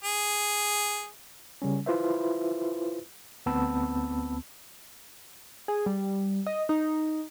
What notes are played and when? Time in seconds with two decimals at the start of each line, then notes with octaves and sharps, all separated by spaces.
0.04 G#4
1.62 C#3 G3 C#4
1.86 E4 F4 B4 C5 E5
3.46 D2 B3 C4 A5 B5 E6
5.68 G#4
5.86 G3
6.47 D#5
6.69 D#4